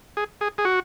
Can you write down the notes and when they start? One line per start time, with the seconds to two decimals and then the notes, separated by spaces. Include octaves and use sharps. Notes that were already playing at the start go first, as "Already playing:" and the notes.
0.17 G#4
0.41 G#4
0.58 G#4
0.65 F#4